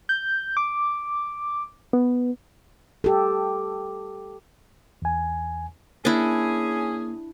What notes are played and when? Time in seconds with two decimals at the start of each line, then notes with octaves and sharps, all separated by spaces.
0.09 G6
0.57 D6
1.93 B3
3.04 G4 A4
5.02 E2 G#5
6.05 A#3 C#4 D4 E4 G#4